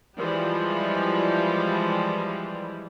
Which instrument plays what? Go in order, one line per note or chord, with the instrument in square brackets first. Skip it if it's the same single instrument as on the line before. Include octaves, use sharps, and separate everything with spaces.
[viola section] E3 F3 G3 G#3